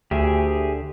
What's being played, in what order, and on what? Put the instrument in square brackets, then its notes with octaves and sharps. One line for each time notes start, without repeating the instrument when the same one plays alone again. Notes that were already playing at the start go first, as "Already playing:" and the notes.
[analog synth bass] D2 [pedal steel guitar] G4 G#4 E5